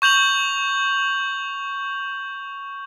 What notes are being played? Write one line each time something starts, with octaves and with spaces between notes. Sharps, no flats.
C#6 G6 F7 F#7